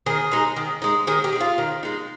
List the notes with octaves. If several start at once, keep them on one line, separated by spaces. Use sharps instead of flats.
D#3 G#4
G#3 D#4
D#3
G#3 D#4
D#3 G#4
G4
G#3 D#4
F4
D#3
G#3 D#4